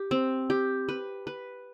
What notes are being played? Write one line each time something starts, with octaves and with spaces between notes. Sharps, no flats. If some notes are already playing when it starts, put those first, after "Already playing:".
Already playing: G4
C4
G4
B4
B4